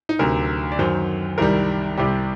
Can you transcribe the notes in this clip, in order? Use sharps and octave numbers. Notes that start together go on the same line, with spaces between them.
D#4
D2 C3 F#3 A#4
D5
F#2 D#3 F#3 C5
C2 C3 D#3 G3 A#4
C2 C3 G3 G4